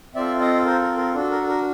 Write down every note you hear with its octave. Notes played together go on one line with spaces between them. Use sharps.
C4 F4 A4 D5 E5
D#5 F5
A#4 C5
A#4
A#4
D4 F#4 A4
A#4
A4
A#4